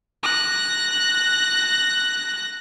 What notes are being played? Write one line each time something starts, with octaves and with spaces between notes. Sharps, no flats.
F#6 A#6